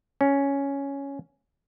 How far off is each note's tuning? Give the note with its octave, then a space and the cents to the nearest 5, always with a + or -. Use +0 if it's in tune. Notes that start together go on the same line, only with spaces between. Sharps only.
C#4 +5